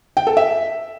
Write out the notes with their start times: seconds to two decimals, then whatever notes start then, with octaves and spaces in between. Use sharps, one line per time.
0.17 G5
0.27 A4
0.37 E5